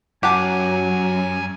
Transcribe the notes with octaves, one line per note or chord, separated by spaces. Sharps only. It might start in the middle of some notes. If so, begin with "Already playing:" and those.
F#2 F#3 G4 F#5 G#5 A5